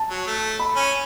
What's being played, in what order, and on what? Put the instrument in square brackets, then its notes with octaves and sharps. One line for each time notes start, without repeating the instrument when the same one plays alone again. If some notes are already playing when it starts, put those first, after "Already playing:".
Already playing: [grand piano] A5
[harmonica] F#3
A3
[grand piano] B5
[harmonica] C#4